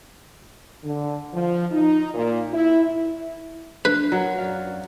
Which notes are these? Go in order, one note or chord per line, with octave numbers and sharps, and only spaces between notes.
D3
F3
D#4
A#2
E4
D4 B4
F#3 A#4 A#5
F#2 D5 F5